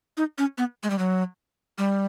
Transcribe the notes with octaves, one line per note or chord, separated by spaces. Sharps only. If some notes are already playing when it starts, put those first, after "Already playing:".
D#4
C#4
B3
G#3
G3
F#3
G3